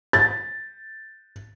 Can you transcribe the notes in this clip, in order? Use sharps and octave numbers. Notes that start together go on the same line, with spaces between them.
A6